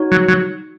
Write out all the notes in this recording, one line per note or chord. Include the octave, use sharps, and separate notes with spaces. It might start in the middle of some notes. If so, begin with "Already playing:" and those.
Already playing: D#4 F#4 C#5
F#3
F#3